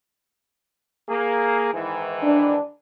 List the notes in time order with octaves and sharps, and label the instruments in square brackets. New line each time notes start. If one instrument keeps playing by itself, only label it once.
[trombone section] A#3 G#4
G#2 D#3 E3
[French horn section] D4